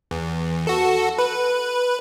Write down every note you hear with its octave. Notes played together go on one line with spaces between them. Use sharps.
E2
F#4 A4
B4